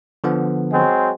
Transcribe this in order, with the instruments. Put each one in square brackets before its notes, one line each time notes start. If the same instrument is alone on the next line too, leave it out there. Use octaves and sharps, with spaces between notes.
[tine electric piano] D3 F3 B3
[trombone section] F#3 G#3 C4